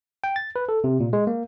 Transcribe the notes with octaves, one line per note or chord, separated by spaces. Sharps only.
G5
A6
B4
A4
C3
A#2
G#3
A#3